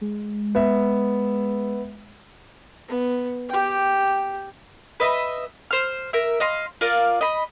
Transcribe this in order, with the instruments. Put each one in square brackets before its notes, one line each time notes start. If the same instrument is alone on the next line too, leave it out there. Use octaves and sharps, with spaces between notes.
[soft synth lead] G#3
[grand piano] B3 E5
[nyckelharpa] B3
G4 G5
[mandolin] B4 D#5 E5
C5 F6
A#4 E5
D#5 F5 C6
F4 A#4 D5 F5
D#5 B5